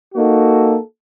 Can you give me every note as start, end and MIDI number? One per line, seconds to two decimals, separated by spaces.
0.15 0.76 58
0.15 0.76 63
0.15 0.76 66
0.15 0.76 69